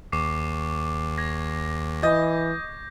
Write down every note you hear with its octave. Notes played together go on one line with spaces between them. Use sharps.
D#2 C#6 D6 C7
G#6 A#6
E3 D#5 G6 A#6